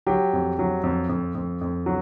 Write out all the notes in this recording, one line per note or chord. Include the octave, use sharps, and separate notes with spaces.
F#3 G4
F2
F#3
F2
F2
F2
F2
F#3